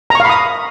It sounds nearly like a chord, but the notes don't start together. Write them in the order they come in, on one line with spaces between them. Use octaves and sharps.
A#5 C#6 F5 B5 D#6